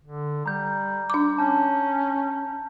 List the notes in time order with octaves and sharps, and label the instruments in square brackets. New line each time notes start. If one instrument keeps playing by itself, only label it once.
[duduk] D3
[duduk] G3 [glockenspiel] A#5 G6
[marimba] D4 D6
[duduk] C#4 [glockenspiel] A5 G6